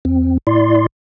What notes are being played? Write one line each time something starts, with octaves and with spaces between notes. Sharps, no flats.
E2 C4
A2 E4 D5 C6